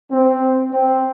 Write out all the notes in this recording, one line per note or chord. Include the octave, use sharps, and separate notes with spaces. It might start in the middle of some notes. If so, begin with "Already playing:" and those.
C4
C4